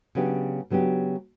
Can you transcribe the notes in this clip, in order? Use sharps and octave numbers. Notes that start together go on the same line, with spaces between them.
C#3 F#3 B3 D4 G4
C#3 F#3 B3 D4 G4